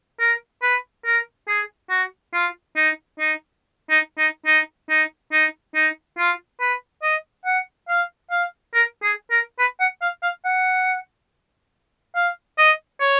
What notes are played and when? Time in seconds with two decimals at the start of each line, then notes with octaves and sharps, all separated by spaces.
0.20 A#4
0.62 B4
1.05 A#4
1.48 G#4
1.90 F#4
2.33 F4
2.76 D#4
3.19 D#4
3.90 D#4
4.18 D#4
4.46 D#4
4.89 D#4
5.32 D#4
5.74 D#4
6.18 F4
6.60 B4
7.02 D#5
7.45 F#5
7.88 F5
8.31 F5
8.74 A#4
9.03 G#4
9.31 A#4
9.59 B4
9.80 F#5
10.02 F5
10.23 F5
10.45 F#5
12.15 F5
12.58 D#5
13.01 C#5